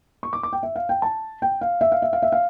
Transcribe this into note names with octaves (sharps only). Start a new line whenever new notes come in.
C#6
D6
D6
G5
E5
F5
G5
A5
G5
F5
E5
F5
E5
F5
E5
F5